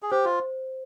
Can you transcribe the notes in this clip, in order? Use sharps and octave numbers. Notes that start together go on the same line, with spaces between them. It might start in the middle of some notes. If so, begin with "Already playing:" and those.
G#4
G4 C5
F4